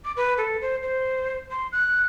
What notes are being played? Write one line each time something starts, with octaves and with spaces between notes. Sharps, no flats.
D6
B4
A4
C5
C5
C6
F#6